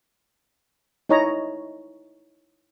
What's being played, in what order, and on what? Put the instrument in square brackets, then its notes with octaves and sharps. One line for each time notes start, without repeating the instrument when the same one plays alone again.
[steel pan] D#4 E4 C#5 D#5 A#5